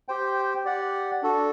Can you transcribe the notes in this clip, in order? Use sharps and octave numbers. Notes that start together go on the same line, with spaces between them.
G4 C5 G5
G4 D5 F#5
D4 F#4 A4